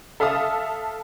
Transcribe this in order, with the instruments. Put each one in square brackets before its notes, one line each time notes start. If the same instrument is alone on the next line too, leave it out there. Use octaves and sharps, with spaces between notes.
[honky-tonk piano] A4 E5 F5 A5 D#6